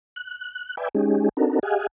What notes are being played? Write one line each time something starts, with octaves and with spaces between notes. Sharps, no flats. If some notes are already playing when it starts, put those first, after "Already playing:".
F#6
B4 D5 E5 G5 G#5
G#3 C#4 D#4 G4 G#4
C4 D4 D#4 F#4 A4 A#4
G4 G#4 D#5 F5 F#5 G#5